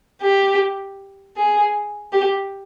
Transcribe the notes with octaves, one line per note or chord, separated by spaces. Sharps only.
G4
G#4
G4